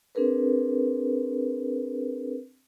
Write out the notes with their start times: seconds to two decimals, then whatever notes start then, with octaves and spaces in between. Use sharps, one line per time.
0.15 C4 D4 G#4 A#4 B4